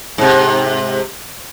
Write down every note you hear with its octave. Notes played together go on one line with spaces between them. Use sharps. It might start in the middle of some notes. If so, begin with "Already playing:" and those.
G#2 C3